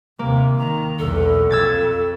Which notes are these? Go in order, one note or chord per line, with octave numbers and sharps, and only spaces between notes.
D#2 C3 A#3
D#3 A#5
B1 E2 A4
F2 E6 G#6 A6